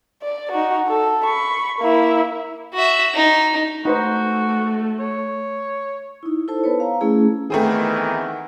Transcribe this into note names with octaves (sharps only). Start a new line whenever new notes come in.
D5
D#4 F#4
A4
B5 C#6
A#3 E4
F#4 E5
D#4
A3 D#4 F#4 B4 C5
C#5
D#4 E4
E4 A4 C5 A5
B3 B4 C#5
F5 A#5
A3 C#4 E4 G#4
D#3 E3 A3 B3 C4 G#4